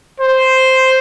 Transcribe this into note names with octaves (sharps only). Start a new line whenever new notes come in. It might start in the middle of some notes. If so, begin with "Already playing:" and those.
C5